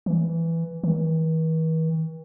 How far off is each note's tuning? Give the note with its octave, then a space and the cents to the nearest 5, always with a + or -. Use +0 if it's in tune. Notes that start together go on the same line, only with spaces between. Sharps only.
E3 +5
E3 -45